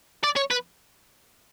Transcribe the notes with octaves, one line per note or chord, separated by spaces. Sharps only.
D5
C#5
B4